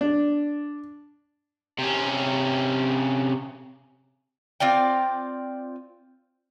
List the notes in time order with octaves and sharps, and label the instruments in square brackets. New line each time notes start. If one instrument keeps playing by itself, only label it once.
[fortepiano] D4
[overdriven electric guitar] C3 C#4
[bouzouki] C4 F4 D5 G5